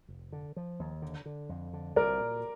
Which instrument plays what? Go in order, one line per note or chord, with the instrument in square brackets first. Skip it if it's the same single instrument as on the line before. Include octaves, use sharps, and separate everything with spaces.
[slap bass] F1
D3
F3
D#2
D3
D3
F2
D3
[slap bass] C2 [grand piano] A#4 D5
[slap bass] A#2